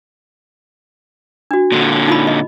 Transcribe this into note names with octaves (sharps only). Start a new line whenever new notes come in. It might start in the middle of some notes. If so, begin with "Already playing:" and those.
D4 F#4
A#2 D3
D#4 F4 B5
D#5